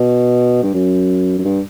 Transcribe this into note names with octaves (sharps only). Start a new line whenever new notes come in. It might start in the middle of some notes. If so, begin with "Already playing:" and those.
Already playing: B2
G2
F#2
F#2
G2